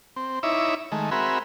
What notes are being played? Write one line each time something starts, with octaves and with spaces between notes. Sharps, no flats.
C4
D#4 E4 C#5 E5 D6
D#3 G#3 A3
C4 F#4 G#4 A#4 E5 B5